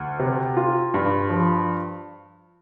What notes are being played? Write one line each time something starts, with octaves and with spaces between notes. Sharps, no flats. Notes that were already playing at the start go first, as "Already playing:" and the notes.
Already playing: D2
C3
F4
G2
F3